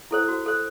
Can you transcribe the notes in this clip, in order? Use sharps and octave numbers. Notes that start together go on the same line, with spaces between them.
E4 A4 C5
F#4
A4 C5